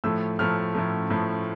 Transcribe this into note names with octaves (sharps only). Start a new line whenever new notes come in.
A2 F3 A3 E6
A2 F3 A3 F6
A2 F3 A3
A2 F3 A3